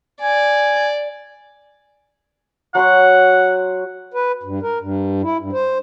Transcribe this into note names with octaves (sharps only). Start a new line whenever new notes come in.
D5 G#5
F#3 F#5 C6 C#6
B4
G2
A#4
G2
E4
G2
C5